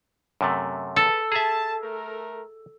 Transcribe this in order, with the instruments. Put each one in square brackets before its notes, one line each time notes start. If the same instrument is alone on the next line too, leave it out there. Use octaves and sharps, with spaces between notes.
[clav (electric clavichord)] F#2 C3 A3
[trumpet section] G#4 B4 A5 [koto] A4
[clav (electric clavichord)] G#4 E5 [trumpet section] A5
[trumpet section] A3 A#4